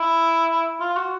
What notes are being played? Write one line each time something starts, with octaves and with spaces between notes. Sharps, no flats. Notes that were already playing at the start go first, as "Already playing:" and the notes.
Already playing: E4
F4
F#4